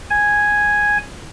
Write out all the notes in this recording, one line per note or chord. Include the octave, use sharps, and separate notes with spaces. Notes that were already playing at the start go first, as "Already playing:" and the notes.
G#5